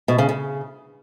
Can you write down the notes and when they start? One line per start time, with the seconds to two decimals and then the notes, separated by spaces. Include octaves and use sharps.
0.08 B2
0.18 C#3
0.29 C#3